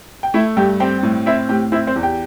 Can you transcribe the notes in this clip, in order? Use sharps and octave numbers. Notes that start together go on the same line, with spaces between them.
G5
A3 E4 E5
G2 G4 G5
C4 G4 G5
A2
C4 E4 E5
A2 G4 G5
C4 E4 E5
C4 C5
E2
G4 G5